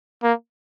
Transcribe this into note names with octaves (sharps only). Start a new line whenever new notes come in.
A#3